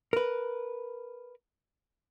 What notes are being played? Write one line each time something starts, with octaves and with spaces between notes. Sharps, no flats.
A#4 B4